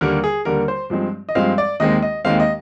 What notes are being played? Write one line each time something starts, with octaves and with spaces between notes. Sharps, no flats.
D#2 D3 G3 A#3 A#4
G#4
D#2 D3 G3 A#3 A#4
C5
G2 F3 G#3 C4
D#5
G2 F3 G#3 C4 F5
D5
D#2 D#3 G#3 C4 D#5
D#5
D#2 D#3 G#3 C4 F5
D#5